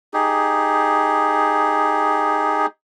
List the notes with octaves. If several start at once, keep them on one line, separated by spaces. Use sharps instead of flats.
D#4 G4 G#4